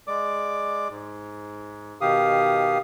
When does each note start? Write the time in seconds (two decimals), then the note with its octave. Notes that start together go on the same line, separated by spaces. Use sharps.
0.07 G#3 D5 D6
0.90 G#2
2.01 B2 D#3 G4 F5 D#6